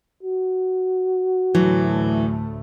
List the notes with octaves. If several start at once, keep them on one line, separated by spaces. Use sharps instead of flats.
F#4
D2 A2 E3 F#3 A3